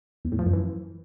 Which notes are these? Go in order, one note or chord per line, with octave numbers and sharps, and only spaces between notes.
E2
A2
F3
F#2
E3